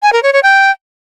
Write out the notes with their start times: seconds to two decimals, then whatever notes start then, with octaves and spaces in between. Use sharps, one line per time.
0.03 G#5
0.13 A#4
0.23 C#5
0.33 C#5
0.43 G5